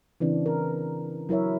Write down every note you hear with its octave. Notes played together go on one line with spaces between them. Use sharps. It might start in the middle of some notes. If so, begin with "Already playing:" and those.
C#3 E3 C4 D4
A#4
F#3 E4 A#4 C#5 E5